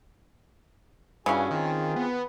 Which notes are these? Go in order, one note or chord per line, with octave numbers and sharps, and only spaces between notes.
G2 C#3 E3 C#4 F#4 G#4 G#5
D#3 C4 F4 G#4
B3